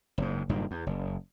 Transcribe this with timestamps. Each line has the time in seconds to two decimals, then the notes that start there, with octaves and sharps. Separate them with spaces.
0.18 F#1 G#2
0.49 F#1 G2 A#2 D#3
0.71 E2
0.86 F#1